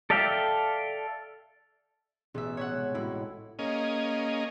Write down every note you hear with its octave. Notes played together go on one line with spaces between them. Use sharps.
A4 D5 E5 F5 G5
A1 B2 B3 G#4 E5
C#5 E5 F#5
C3 G#3
A2 G#3 A3 E4 F#4
A#3 C#4 G#4 D#5